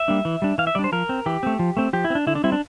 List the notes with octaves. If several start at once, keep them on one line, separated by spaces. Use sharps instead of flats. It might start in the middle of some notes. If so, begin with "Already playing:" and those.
Already playing: E5
G3 A#3 D4
E3
G3 D4
E3 F5
E5
G3 D4 D5
C5
F3 A#4
C4
E3 G4
A3 C4
F3
A3 C4
F3 G4
E4
C4
D4
D3 E4
D4
G3 C4 E4
D4